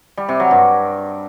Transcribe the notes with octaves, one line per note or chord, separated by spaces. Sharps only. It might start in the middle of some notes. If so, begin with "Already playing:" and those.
G3
C3
F#3
G2